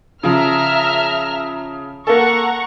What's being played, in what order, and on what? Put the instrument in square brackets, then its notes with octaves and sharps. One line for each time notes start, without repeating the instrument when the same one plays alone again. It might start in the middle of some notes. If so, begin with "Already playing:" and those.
[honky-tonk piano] C#3 F3 [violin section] E5 A#5 F6
[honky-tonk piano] A#3 A4 [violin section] F#5 A#5 C#6